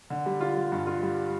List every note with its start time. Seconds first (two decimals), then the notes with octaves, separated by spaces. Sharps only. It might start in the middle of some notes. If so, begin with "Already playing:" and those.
0.10 D3
0.26 G3
0.41 F4
0.57 G3
0.72 G2
0.87 F4
1.03 G3